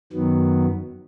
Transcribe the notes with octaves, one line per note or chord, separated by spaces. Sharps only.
F#2 D#3 F#3 B3